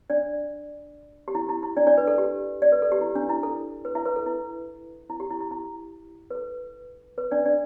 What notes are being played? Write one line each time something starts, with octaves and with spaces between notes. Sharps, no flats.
D4 D5
G4
E4
E4
E4
D4 D5
D4 D5
B4
A4
G4
D5
B4
A4
G4
E4
D4
E4
A4
B4
E4 E5
B4
A4
E4
E4
G4
E4
E4
E4
B4
A4
B4
D4 D5
D4 D5